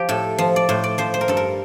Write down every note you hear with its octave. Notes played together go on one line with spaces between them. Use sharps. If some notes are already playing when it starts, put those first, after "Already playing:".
Already playing: F3 G4
A2 A4
F3
D5
A2 C5
D5
F3 C5
C5
A#4
G2 A4
A#4